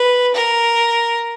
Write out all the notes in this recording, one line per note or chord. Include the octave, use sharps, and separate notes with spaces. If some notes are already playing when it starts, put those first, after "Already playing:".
Already playing: B4
A#4